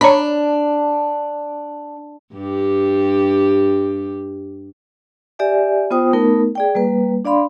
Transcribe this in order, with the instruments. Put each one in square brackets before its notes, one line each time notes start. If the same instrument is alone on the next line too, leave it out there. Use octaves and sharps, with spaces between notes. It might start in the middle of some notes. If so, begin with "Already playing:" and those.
[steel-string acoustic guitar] D4 [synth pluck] C#5 A#5 B5
[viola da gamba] G2 G4
[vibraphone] G4 D5 E5 G#5
B3 F4 C5 G5 D#6
A3 B3 D#4 A#4
G#4 D5 G5
G3 A#3 B4
D4 D5 F5 B5 C6